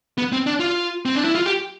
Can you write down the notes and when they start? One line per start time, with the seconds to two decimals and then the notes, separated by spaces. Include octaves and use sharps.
0.18 B3
0.32 C4
0.46 D4
0.60 F4
1.05 C4
1.15 D4
1.25 E4
1.35 F4
1.46 G4